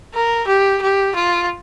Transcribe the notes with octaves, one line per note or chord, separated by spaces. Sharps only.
A#4
G4
G4
F4